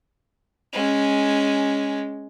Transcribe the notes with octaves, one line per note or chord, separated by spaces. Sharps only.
G#3 C#4